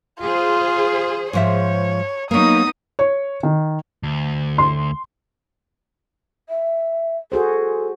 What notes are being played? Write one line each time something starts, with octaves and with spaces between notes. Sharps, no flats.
F4 G#4 C5
G#2 F3 C#5 E5
F#3 A#3 B3 D#4 D#6
C#5
D#3
D2
C6
E5
F#4 G#4 A4 C5